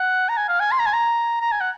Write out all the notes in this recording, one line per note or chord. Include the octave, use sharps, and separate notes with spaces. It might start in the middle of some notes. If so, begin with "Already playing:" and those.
Already playing: F#5
A#5
G#5
F5
G#5
C6
A#5
G#5
A#5
A#5
G#5
F#5